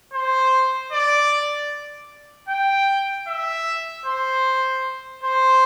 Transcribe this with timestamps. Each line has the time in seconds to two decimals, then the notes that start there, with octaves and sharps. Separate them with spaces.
0.13 C5
0.92 D5
2.49 G5
3.27 E5
4.06 C5
5.23 C5